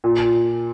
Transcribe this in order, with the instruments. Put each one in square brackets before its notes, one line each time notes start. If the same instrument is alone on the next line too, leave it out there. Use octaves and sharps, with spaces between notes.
[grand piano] A#2